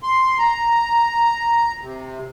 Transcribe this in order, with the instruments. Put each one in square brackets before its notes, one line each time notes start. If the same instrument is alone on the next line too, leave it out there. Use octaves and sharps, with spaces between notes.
[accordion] C6
A#5
C3